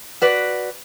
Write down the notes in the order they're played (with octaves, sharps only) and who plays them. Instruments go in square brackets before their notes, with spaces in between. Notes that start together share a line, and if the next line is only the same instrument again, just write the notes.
[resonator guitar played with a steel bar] F#4 B4 D5